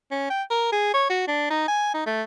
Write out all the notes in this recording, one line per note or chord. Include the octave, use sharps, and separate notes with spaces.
C#4
G5
A#4
G#4
C#5
F#4
D4
D#4
G#5
D#4
A3